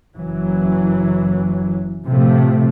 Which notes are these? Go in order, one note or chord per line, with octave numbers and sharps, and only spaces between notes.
F#1 E3 F#3
A2 C3 F3 A3